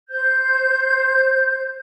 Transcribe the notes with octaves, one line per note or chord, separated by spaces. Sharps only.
C5 G6